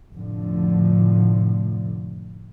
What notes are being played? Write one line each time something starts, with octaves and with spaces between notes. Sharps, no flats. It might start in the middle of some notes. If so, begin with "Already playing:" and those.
F1 A2 D3 F3